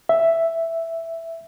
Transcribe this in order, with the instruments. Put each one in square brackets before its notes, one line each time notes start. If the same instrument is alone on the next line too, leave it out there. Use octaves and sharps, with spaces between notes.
[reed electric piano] E5